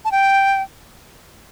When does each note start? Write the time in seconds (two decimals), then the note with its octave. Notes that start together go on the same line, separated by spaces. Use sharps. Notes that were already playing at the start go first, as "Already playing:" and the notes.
0.05 A5
0.12 G5